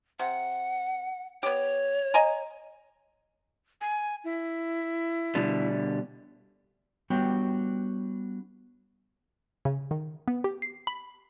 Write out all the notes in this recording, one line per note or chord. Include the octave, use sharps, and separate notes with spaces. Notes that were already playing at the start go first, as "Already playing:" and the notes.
C3 F#5
B3 G4 C#5
D#5 G#5 A#5
G#5
E4
B2 D3 G3
G3 B3 D4 F#4 C#5 G5
C#3
D#3
B3
G4
C7
B5